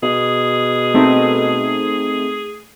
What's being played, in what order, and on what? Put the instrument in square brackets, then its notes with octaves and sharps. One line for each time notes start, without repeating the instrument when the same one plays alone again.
[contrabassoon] B2 [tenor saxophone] G#4
[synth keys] A3 C4 D#4